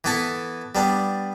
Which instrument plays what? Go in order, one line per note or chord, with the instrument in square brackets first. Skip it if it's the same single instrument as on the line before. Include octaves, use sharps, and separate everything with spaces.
[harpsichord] E3 B3 E4 A4
G3 B3 D4